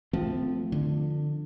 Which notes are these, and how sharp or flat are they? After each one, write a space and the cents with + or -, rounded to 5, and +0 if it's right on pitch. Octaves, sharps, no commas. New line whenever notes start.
F3 +5 A3 +0 C4 -25
D3 +20 F3 +0